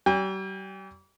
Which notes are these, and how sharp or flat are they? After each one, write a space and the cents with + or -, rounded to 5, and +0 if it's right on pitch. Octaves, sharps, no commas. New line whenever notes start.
G3 -40 G5 +45